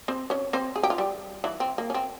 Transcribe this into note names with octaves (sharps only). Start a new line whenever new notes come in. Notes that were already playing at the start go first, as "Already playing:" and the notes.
C4 C5
C#4 C#5
C4 C5
G#4
G4
F4
G3 G4
E3 E4
C4
A#3
C#4
C4